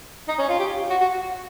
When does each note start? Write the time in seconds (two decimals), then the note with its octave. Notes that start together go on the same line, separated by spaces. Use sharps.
0.28 D#4
0.39 C#4
0.49 F4
0.59 G4
0.90 F#4
1.00 F#4